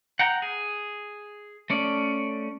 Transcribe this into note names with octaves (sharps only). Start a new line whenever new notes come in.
F#5 G5 A#5
G#4
A3 C#4 D5